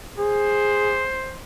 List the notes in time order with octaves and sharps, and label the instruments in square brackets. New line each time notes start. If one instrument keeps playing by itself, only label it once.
[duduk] G#4 [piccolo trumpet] C5